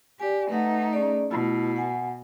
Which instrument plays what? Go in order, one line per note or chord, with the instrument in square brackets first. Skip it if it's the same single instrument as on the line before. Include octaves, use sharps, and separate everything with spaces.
[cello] G4 [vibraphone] D5 G#5
[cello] A3 D#4 [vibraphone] B4 F#5
[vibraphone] C#4 G#4 D5
[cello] B2 [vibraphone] A3 E4 F4
[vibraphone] F#5 G#5